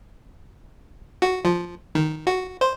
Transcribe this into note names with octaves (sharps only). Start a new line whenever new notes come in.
F#4
F3
D#3
F#4
C5